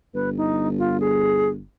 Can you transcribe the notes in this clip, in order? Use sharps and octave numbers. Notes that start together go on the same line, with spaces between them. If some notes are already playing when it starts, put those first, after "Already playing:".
G1 B4
D#4
F4
G#4